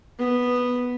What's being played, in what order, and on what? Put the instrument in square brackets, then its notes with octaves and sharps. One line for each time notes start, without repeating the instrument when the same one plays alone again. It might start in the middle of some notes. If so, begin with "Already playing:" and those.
[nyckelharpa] B3